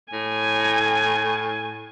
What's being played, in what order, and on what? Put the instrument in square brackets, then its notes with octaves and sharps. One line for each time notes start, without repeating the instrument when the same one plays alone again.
[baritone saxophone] A2 [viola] G#5